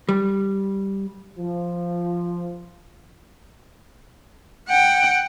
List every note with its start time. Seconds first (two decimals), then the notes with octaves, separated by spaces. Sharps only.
0.09 G3
1.39 F3
4.69 F#5 G5